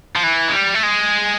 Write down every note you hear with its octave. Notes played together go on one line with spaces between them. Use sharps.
F3
E3
G#3
G3
A3
G#3